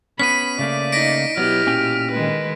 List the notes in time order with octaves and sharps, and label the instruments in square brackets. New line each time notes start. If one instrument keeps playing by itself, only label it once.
[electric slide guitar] B3 C#4 [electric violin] B5 [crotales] B6 D#7
[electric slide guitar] C#3 A3 A#3 [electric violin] D5
[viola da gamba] D#4 [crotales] A#6 B6 D7
[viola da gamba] B2 E4 G4 [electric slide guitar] F#3 B3 [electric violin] F6
[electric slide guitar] A#2 C#4 G5
[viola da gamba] D#3 G#3 [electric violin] B4